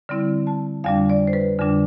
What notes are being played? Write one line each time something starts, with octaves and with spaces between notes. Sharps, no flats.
D3 G3 C4 E4
A5
F2 D3 G3 D4 F5
D5
C5
B4
F2 D3 G3 D4